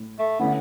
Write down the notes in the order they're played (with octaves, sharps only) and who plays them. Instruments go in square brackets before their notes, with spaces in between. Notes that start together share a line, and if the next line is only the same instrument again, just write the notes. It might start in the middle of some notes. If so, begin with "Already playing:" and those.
Already playing: [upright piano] A2
[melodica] A3
[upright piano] D3 A3 C#4 E4 [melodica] B3